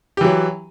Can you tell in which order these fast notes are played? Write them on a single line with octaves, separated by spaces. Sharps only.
G4 E3 F#3